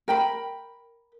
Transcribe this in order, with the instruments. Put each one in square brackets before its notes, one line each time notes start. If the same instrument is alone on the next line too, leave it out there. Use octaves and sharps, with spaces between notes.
[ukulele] A#4 G5 B5